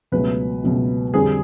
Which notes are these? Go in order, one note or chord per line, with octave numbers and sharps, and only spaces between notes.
C#2 B2 F#3 A3 B4
C#2 B2 F#3 A3
F2 D3 G3 G#4